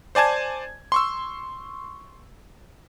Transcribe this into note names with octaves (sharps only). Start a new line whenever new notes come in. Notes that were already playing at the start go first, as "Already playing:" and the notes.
C5 D5 G#5 A5 G#6
C6 C#6 E6